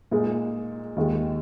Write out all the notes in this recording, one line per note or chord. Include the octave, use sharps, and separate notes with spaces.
A#2 G#3 D#4 G#4
D#2 D#3 G#3